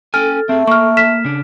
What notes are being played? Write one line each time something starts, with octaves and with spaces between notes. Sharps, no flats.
C#4 A4 G5 G#5 F6
A3 C4 G#4
A#3 C#6 F6
F6 B6 E7
C#3 D4